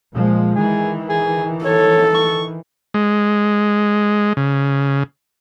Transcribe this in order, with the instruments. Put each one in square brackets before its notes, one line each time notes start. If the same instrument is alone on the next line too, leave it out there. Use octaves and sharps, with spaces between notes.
[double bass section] A#2 F3 G#3
[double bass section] D#3 E3 [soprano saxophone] G#4
[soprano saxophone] G#4
[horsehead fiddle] A4 [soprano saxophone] C#5
[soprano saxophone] C#6
[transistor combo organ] G#3
C#3